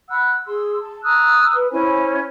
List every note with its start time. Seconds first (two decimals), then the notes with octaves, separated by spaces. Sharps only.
0.08 F#5 B5 E6 F#6
0.45 G#4 C6 E6
0.79 A5
1.03 A#5 D#6 E6 F#6
1.54 B4
1.70 C#4 E4 C5 G#5